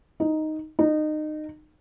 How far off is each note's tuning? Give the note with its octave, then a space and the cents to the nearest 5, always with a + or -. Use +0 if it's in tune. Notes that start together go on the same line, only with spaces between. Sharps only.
D#4 +0
D#4 -25